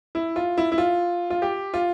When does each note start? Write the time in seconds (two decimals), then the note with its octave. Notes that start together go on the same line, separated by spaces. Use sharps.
0.15 E4
0.36 F4
0.57 E4
0.72 E4
0.78 F4
1.30 F4
1.42 G4
1.74 F4